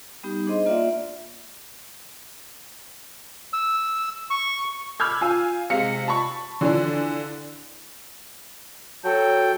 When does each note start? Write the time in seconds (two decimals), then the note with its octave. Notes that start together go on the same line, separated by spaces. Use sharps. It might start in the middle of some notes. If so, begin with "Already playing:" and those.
0.23 G3 B3 D#4 G4
0.47 D4 G#4 C5 D#5 C6
0.66 A#3 F4 D5 E5 F#5
3.53 E6
4.30 C#6
5.00 B5 D6 E6 F6 G6 G#6
5.21 F4 G#5 E6
5.70 C3 G#3 F5 C#7
6.08 A5 B5 C#6
6.61 D3 E3 F3 D4
9.05 F#3 A4 G5